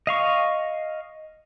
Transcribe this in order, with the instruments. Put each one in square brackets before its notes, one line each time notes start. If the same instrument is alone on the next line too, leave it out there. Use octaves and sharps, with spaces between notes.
[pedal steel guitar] D#5 F5 C#6